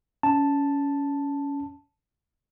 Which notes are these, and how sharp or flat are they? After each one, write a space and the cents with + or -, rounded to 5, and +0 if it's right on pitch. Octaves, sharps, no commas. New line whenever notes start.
C#4 +20 A5 +0